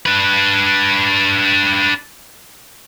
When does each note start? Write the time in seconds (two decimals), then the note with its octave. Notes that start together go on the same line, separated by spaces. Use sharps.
0.06 D4 B4